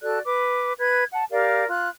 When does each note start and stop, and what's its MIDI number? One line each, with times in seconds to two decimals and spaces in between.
0.01 0.20 66
0.01 0.20 69
0.01 0.20 74
0.01 0.20 90
0.25 0.74 71
0.25 0.74 86
0.80 1.04 71
0.80 1.04 90
0.80 1.04 92
1.12 1.24 78
1.12 1.24 81
1.31 1.65 67
1.31 1.65 70
1.31 1.65 74
1.31 1.65 77
1.69 1.88 65
1.69 1.88 90